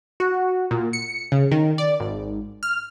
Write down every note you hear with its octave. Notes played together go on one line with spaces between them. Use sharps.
F#4
A#2
C#7
C#3
D#3
D5
G#1
F6